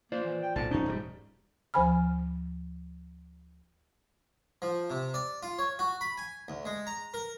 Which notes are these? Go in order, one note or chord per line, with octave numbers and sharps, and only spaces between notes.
A#3 F4 C5 D5
E3
G5
B1 A#2 A5
F2 C#4 D#4
E1 G#2 G3
D2 F3 C5 G#5 B5 F6
F3
C3
D5
F4
C#5
F#4
B5
G#5
D2
G#3
A#5
A#4